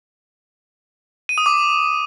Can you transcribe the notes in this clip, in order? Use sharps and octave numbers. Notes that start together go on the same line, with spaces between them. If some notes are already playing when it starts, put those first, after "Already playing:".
D#7
D#6
D6